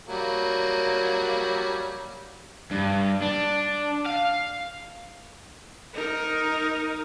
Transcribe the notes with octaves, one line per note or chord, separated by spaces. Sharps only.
F#3 G3 A#3
G2
D4
F5
D#4 A#4